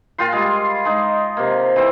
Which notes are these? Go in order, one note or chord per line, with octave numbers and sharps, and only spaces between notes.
A#2 F4 G5 C6
G3 G#3
G#3 D#4
C3 A#3
E3 C4